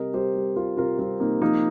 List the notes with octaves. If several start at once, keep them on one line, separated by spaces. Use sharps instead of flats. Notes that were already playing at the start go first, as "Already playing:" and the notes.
Already playing: C3 G3 A#4 D#5
G3 G4 C5
G3
G3 F4 A#4
C3 F4 A#4
G3 C4 F4
C3 A#3 D#4
F3 A#3 D#4